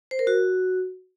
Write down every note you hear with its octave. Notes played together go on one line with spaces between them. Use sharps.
C5
A#4
F#4